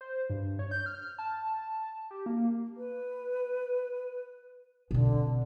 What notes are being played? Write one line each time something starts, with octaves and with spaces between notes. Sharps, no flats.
C5
G2
C#5
G6
F6
A5
G4
A#3
B4
B2 D3 C4